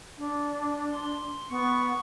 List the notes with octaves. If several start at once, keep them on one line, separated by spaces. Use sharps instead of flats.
D4
C6
B3 C#6